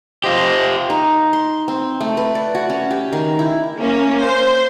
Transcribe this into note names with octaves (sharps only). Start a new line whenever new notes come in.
F4 G4 C5 D#5
D#4
C6
C4
A3
B4
D5
F#4
C#4
G4
D#3
E4
A#3 C#4
C5